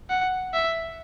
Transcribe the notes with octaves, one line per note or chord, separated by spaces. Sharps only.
F#5
E5